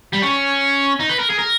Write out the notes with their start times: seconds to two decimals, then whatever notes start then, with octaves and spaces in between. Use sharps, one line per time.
0.13 G3
0.22 C#4
1.00 D#4
1.09 B4
1.19 A#4
1.30 G#4
1.39 A#4